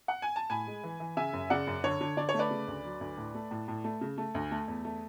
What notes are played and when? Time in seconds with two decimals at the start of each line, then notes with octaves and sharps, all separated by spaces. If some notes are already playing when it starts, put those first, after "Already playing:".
0.08 F#5
0.22 G#5
0.36 A5
0.50 A2 G#5 B5
0.67 G#3
0.84 E3
1.00 E3
1.17 C#3 E5 G#5
1.33 F#2
1.50 C#3 D5 F#5
1.67 F#2
1.84 D3 C#5
2.01 D3
2.17 D3 D5
2.29 C#5
2.34 A3
2.39 B4 D5
2.50 C#3
2.67 D2
2.85 F#3
3.01 D2
3.18 A2
3.35 A3
3.51 A2
3.68 A2
3.84 A3
4.01 C#3
4.18 A3
4.35 D2
4.51 A3
4.68 E2
4.85 A3